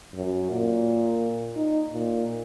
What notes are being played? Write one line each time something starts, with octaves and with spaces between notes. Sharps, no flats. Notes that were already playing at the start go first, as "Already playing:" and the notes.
F#2
A#2
D#4
A#2